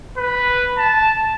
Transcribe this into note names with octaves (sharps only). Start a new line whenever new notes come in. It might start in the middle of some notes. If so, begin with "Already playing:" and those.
B4
A5